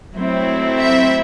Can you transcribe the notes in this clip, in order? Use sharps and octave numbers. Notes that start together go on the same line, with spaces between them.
F#3 A3 C4 E4
E5